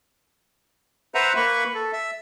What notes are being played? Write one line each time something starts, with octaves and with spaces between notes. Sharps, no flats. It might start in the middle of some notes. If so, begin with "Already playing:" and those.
B4 C5 E5 F#5 A#5
A#3 B4 B5 C#6
A4
E5